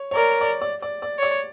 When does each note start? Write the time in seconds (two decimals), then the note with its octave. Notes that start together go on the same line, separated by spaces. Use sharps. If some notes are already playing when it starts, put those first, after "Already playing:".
Already playing: C#5
0.11 C#5
0.15 A#4 D5
0.41 D5
0.62 D5
0.82 D5
1.02 D5
1.19 C#5 D5